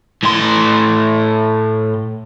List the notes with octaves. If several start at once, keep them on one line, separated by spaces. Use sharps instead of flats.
A2 C6